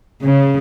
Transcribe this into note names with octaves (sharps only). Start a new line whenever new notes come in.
C#3